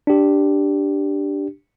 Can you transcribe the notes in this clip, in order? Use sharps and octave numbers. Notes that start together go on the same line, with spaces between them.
D4 G4